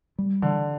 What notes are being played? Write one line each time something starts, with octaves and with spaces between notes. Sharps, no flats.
G3
D3 E3